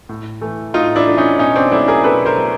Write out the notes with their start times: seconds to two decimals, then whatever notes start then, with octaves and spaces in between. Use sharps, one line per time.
0.09 A2
0.41 E3 A3
0.74 A2 D#4 F4
0.96 D4 E4
1.07 E3 A3
1.18 C#4 D#4
1.39 B2 C#4 D#4
1.56 C4 D4
1.71 F#3 A3 D4 E4
1.88 G#4 A#4
2.04 B2 A4 B4
2.26 A#4 C5
2.37 F#3 A3